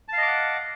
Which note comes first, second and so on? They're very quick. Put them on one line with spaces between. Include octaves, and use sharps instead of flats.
A5 F5 D#5 D6 F#5